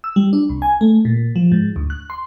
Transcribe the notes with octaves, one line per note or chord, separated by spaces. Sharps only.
E6
G3
D4
C2
G#5
A3
A#2
F3
G#2
D2
F#6
C6